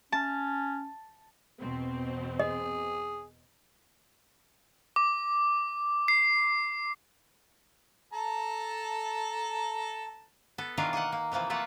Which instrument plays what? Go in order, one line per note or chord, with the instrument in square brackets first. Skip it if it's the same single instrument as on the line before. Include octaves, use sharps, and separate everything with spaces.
[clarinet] C#4 [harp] A5
[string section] E2 B2 C4
[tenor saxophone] G#4 [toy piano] D#5
[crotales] D6
C7
[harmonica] A4 A5 A#5
[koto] B3 A4
B2 D#3 E3 D4 F4 A#4
A#3 A#4 D#5 F#5
A#3
C3 E3 F3 A#3
A3 A#3 F4 E5 F#5